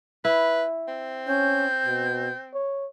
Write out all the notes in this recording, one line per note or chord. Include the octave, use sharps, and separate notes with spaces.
E4 B4
C4
C#4 G6
B2
C#5